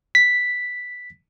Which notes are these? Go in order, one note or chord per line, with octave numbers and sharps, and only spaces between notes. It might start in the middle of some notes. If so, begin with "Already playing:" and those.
B6